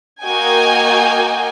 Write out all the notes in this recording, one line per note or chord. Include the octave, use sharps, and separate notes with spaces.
A#3 F#4 A#4 D#5 G5 G#5